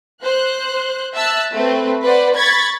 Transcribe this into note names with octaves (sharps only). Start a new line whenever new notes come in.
C5 F#6
E5 A5 E6 F#6
A3 C4 B4
B4 C5 D5 F#5
B5 C#6 G#6 A6 B6